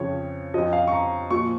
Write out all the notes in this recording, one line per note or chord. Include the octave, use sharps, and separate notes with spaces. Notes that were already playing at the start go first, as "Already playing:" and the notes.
Already playing: F2 C#3 F3 C#5
F2 F3 D#5
F5
C#6
A#5
A#2 F3 C#6